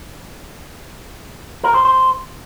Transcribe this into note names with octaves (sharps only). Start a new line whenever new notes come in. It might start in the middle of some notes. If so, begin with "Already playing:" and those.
A#4
C5
C5